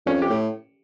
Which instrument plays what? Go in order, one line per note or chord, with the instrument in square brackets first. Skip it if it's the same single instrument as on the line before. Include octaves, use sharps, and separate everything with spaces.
[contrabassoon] F2 [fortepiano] C#4
[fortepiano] G4
[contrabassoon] A2